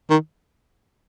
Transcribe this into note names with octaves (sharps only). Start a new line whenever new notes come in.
D#3